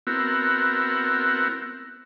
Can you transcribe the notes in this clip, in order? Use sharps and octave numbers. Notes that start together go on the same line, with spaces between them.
B3 C4 E4 F#4 A#4